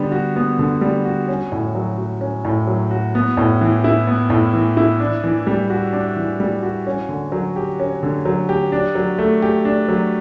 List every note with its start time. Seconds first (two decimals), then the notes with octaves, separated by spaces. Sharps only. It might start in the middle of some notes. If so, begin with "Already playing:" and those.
Already playing: D3 G3 B3
0.12 F#4
0.36 B3
0.59 D3
0.81 G3
1.05 F#4
1.28 C#4
1.52 A2
1.75 F#3
1.98 F#4
2.21 C#4
2.45 A2
2.67 F#3
2.91 F#4
3.15 B3
3.37 A2
3.61 E3
3.84 E4
4.07 B3
4.30 A2
4.53 E3
4.77 E4
5.00 D4
5.24 E3
5.47 G3
5.70 F#4
5.93 D4
6.16 E3
6.40 G3
6.63 F#4
6.87 C#4
7.09 D3
7.32 F#3
7.56 G4
7.80 C#4
8.03 D3
8.26 F#3
8.49 G4
8.72 D4
8.95 F#3
9.18 A3
9.42 G4
9.65 D4
9.89 F#3